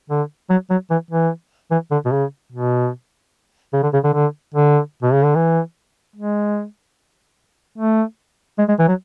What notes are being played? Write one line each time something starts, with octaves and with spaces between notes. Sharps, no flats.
D3
F#3
F#3
E3
E3
E3
D3
B2
C#3
B2
C#3
D3
C#3
D3
D3
D3
B2
C#3
D3
E3
G#3
A3
G#3
G#3
E3
F#3